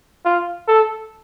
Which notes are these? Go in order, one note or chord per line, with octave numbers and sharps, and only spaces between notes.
F4
A4